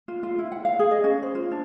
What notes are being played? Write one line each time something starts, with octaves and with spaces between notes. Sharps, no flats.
F4
F4
E4
F#5
F5
G#4
D#5
C#4
C5
F4
D4